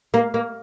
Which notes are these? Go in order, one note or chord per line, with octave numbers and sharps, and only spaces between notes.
A#3
A#3